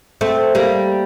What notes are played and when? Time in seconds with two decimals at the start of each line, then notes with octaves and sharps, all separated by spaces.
0.21 A3 C4
0.55 G3 A#3